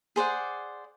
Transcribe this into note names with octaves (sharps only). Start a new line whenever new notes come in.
G#4 C5 D5 F#5